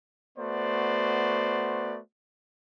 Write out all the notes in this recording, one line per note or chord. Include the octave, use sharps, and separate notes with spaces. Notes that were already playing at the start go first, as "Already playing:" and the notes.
A3 B3 F#4 C5 D5